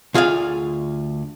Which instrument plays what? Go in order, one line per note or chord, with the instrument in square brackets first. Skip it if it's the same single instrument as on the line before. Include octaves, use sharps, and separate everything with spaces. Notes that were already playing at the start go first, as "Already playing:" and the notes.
[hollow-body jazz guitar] D2 F4 G#4 D5 F5